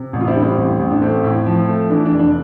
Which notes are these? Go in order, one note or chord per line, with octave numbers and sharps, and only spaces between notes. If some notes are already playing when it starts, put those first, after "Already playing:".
Already playing: C3
A1
F4
C4 E4
G3 D4
C4 E4
A1
A1
D4
A3 C4
A2
F3
A3
E3 D4
D4
F1
D4